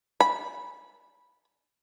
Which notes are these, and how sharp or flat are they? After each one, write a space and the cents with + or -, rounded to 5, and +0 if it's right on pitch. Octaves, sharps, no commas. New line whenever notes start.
B5 -10